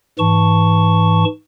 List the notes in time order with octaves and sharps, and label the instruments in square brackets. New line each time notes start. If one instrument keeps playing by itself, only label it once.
[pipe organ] G#2 E3 A5 C#6